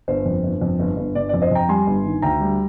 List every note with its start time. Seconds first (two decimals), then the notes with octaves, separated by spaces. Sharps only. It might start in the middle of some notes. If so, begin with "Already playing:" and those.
0.08 G1 C5
0.26 F2
0.44 G1
0.61 F2
0.79 G1
0.97 G1
1.15 G1 D5
1.29 F2 D5
1.42 C5 D#5
1.51 F2 G5 A#5
1.69 G3 G#5 C6
1.87 G1
2.05 D#3
2.22 D2 G5 A#5
2.40 G3